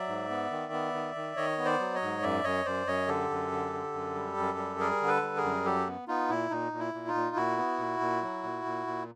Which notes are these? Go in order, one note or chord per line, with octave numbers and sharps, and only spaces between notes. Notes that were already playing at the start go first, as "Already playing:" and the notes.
Already playing: F#3 D5 E5
G#2
B3
D#3
B3
D#3
D#3
D#3 C#5 D#5
B3
C5 D5
F#3
C#5 D#5
G#2
F#2 D5 E5
F#2 C#5 D#5
F#2 C5 D5
F#2 C#5 D#5
D3 G4 A4
F#2
D3
D3
F#2
G3
F#2
G3
G3 G#4 A#4
D3
A4 B4
G3
G#4 A#4
F#2
F#3 G4 A4
B3
B3 D#4 F4
A#2 E4
A#2 D#4
A#2
E4
A#2
D#4 F4
A#2
A#2 E4 F#4
B3
A#2
A#2
F#3
A#2
A#2
A#2